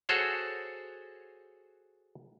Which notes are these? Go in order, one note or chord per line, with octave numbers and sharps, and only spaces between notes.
F#4 G#4 A4 C5 C#5